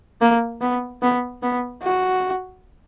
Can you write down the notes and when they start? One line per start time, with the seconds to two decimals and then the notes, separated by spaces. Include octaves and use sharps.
0.21 A#3
0.61 B3
1.02 B3
1.42 B3
1.83 F#4